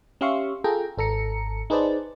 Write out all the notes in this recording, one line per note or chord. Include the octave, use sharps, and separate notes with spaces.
C#4 G4 E5 F5 C6 C#6
F4 G#4 A4 G5 A#5
G#1 A4 A#5 C#7
D#4 G#4 B4 C5 D5 A5